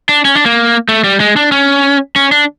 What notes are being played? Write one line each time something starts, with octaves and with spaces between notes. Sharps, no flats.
D4
C#4
D4
A#3
A3
G3
G#3
D4
C#4
C#4
D4